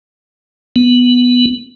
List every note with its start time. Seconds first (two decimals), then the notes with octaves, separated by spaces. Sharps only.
0.76 B3